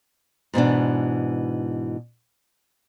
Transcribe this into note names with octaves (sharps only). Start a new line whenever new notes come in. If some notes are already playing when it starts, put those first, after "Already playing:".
G#2 B2 E3 D4